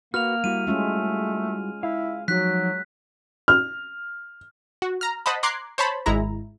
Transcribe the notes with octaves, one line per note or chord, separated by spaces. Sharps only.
A#3 F#4 B4 F6 F7
G3 E4 F#4 D#7
G#3 A3 C#4 F4
E4 F5
F3 F#3 D#4 F#4 F#6 B6
F6
F#4
A#5 F6
C5 D#5 F#5 A5 B5
A#5 C6 D6 F#6 G#6 C7
C5 C#5 A5 B5
G#1 G#3 E4 A#5